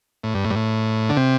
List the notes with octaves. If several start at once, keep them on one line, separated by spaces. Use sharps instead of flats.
A2
G2
A2
G2
A2
D3
C3